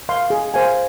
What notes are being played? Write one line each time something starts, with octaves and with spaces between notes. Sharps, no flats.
F5 C6
G#4
C5 F5 G#5